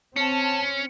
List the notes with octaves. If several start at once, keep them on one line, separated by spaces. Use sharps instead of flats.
C4 C#4 A5 C#7